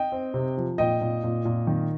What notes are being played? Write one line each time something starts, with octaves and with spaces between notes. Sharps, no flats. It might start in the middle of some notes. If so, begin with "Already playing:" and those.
Already playing: D#5 G5
C4
C3
F3
A#2 D#5 G5
A#2
A#2
A#2
D#3